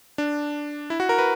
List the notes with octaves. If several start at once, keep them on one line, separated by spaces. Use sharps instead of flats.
D4
E4
F#4
A#4
B4